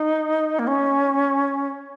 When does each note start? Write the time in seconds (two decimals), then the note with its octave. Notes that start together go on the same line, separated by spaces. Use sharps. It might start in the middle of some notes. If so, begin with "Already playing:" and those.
Already playing: D#4
0.59 A#3
0.67 C#4